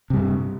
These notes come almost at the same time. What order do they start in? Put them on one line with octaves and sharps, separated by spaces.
C3 G3 G2